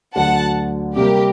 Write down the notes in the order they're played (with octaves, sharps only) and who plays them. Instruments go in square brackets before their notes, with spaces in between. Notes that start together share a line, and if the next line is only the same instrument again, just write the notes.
[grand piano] D2 D3 F#3 [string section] F#5 A5
[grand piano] C3 G3 A#3 [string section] G4 A#4